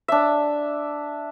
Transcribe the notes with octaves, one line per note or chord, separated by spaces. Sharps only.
D4 E5